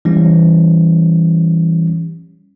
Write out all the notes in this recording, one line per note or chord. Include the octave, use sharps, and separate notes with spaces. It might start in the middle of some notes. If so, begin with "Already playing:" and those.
E3 G3 C#4